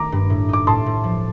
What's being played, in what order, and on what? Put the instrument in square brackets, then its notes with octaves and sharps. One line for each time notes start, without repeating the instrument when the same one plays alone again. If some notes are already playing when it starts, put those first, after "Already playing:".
Already playing: [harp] D#3 A3 [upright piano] A#5 D6
[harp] G2
A2
[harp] D#4 [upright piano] D6
[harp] A2 [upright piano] A5 C6
[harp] A2
F3